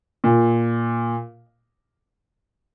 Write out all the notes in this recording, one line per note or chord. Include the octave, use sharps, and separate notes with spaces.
A#2